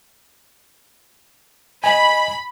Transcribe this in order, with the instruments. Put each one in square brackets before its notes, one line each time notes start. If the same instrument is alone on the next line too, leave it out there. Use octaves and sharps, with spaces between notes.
[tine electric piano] D#5 G#5 [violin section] B5